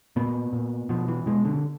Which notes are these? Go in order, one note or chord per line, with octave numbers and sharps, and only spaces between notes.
A#2 B3
A#2
B2 F3
E3
B2 G#3
D3